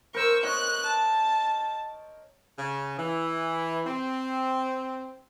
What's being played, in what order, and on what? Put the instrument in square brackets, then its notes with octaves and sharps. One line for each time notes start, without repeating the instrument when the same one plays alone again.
[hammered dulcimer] A#4 C5 [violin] C#6 E6
[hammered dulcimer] C#5 D#5 [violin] F#6
[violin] A5
[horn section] C#3
E3
C4